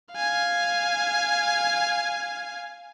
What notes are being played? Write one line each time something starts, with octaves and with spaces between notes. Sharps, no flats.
F5 G#5